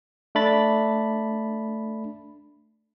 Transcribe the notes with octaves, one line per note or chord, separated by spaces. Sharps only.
A3 D4 B5 A6